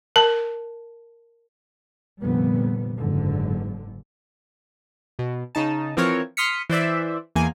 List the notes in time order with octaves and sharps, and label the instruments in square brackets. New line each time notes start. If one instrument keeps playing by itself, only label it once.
[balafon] A#4 A5
[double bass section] F1 F2 A#2 D3 G3 B3
F#1 G#2 D3
[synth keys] B2
C#3 D#4 A5
E3 F3 C4 A#4 C#5
C6 D#6 F6 B6 C#7
E3 C5 D5 E5
E2 A#3 G#5